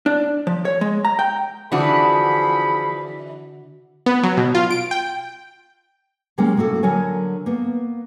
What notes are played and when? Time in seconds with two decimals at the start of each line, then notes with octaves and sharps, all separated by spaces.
0.06 D4
0.47 F3
0.65 C#5
0.81 G#3
1.05 A#5
1.19 G5
1.72 D3 E3 F3 D4 F#4 G#4 B5 D#6
4.06 B3
4.23 F#3
4.37 B2
4.55 F4
4.70 D7
4.91 G5
6.38 C3 F#3 G#3 A#3 C#4 G5
6.57 A2 A#3 F#4 A4
6.83 D3 F#3 A#4 C#5 G#5
7.46 A#3 B3